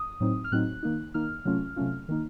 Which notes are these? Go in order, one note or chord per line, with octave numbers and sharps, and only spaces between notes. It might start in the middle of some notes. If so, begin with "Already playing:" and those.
Already playing: D#6
A2 F#3 C4 D#4
F6
A2 F#3 C4 D#4 F#6
D#3 A#3 D#4
D#3 A#3 D#4 F6
C3 F#3 A3 C#4 F4
C3 F#3 A3 C#4 F4
D#3 A#3 D#4